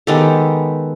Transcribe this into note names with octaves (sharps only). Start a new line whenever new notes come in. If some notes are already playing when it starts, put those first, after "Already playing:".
D#3 G#3 B3 G4 A4